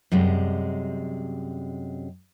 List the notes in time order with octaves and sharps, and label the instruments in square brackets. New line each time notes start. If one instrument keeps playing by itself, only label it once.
[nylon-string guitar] F#2 C3 G3 G#3